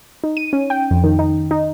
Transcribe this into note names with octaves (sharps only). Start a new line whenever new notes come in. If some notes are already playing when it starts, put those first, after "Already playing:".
D#4
D#7
C#4
G5
F2
D#3
D#4
D#4